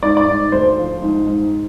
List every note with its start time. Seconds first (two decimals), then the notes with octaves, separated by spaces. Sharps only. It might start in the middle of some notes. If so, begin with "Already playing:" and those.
0.03 G#2 D5
0.17 D5
0.27 G#2
0.52 D2 C5
0.78 F3
1.02 G#2
1.27 G#2